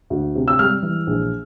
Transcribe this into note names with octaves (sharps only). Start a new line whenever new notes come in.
D2
C3
E6
G3 F6
E3
A#1